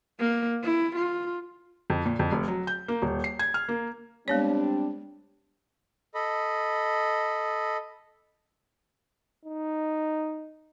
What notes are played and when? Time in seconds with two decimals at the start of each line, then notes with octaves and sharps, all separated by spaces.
0.20 A#3
0.64 E4
0.96 F4
1.90 F2
2.06 A#2
2.19 F2
2.32 F1
2.48 F#3
2.67 G6
2.88 A#3
3.02 D#1
3.24 C7
3.39 G#6
3.54 F6
3.69 A#3
4.28 G3 G#3 B3 C4 D4 C#5
6.15 A4 D#5 B5
9.45 D#4